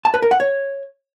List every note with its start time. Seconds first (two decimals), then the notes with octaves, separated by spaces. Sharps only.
0.05 A5
0.14 B4
0.22 A#4
0.31 F#5
0.40 C#5